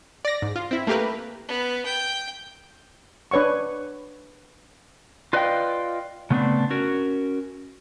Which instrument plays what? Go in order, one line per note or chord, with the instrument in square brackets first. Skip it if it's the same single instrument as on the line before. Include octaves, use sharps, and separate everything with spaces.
[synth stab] D5 A#6
G#2
F4
C4 E4
A3 A#3 G4 A#4 B4
[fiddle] B3
G5
[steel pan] D4 B4 C#5 F#5 C#6
[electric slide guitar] F4 B4 D5 D#5 F5 G5
C#3 A3 B3 C4 D4
C#4 F#4 A#4